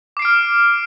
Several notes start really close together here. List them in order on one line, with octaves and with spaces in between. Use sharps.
D6 C7 D7 F6